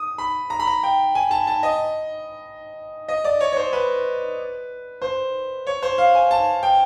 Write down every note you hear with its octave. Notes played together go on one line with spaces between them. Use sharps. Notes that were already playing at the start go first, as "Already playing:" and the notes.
Already playing: D#6
B5
A#5
B5
A#5
G5
G#5
A5
A5
D#5
D#5
D5
C#5
C#5
C5
B4
C5
C#5
C5
F5
G#5
A5
G5